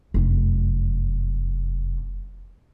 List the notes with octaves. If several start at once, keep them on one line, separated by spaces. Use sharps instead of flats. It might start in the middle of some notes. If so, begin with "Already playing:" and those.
F1 F#2